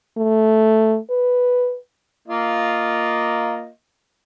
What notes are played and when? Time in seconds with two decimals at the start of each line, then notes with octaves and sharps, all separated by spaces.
0.17 A3
1.10 B4
2.28 A#3 F4 D#5